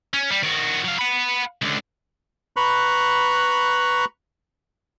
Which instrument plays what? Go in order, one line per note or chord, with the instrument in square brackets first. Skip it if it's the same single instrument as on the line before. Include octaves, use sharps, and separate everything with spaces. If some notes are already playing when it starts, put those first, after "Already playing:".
[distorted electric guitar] C#4
G3
D#3 F#4
F#3 F5
F#5 B5
C#2 D3
[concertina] B4 A#5 B5 C#6 F#6